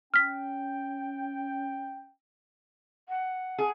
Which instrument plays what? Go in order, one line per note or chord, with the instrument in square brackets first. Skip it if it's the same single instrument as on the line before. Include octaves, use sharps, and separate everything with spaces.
[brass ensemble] C#4 G5 [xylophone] F6 B6
[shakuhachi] F#5
[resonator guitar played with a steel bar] G#4